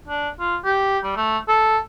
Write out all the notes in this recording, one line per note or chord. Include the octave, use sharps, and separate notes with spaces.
D4
F4
G4
G3
A3
A4